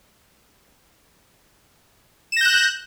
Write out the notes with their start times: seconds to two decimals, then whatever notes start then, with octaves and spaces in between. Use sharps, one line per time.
2.32 E7
2.36 A#6
2.41 G6
2.45 F#6